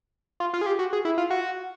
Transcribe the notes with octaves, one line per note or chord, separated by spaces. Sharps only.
F4
F4
G#4
G4
F#4
G#4
E4
F4
F#4